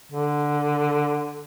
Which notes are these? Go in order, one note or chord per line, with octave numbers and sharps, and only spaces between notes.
D3